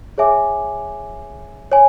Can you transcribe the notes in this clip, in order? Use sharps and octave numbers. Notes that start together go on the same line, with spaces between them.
G#4 C#5 E5 G#5 D6
C#5 G#5